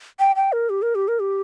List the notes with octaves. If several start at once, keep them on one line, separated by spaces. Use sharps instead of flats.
G5
G5
A#4
G4
A#4
G4
A#4
G4